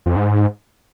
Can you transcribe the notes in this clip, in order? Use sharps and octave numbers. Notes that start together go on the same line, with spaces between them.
F2
G#2